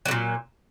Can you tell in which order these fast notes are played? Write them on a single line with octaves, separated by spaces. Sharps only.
F#3 D3 A#2